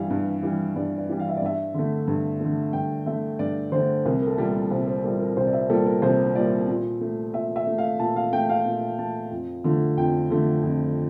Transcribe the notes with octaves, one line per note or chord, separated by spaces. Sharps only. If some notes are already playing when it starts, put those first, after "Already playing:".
Already playing: G2 E3 G3 F5
G2
E3 G3
G2 D5
D5
E3 G3
F5
E5
D5
G2 E5
D3 A3
G2
D3 A3
G2 G5
D3 A3 E5
G2 D5
D3 A3 C5
C2 A#4
A#4
A4
A#2 G3 A#3
A4
C2 C5
C5
A#2 G3 A#3 A4
A#4
C2 C5
D5
E5
A#2 G3 A#3 A4
A#4
C2 C5
A#2 G3 A#3 D5
A#2
A3
A#2 E5
E5
A3
F5
A#2 A5
F5
A3 G5
F5
A#2
A3 A5
F2
D3 F3 A3
F2 G5
D3 F3 A3
F2